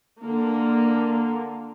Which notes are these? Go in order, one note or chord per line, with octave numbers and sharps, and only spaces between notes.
D3 A#3 F4